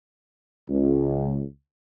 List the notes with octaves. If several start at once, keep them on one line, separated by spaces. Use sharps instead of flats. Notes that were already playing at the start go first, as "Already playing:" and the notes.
C#2